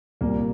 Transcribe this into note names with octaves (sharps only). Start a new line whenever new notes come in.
C2 A#2 G3 A#3